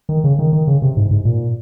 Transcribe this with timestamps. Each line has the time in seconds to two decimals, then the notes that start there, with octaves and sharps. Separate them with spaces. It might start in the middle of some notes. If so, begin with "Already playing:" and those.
0.09 D#3
0.24 C#3
0.39 D#3
0.53 D#3
0.67 C#3
0.82 C3
0.97 G#2
1.11 G#2
1.25 A#2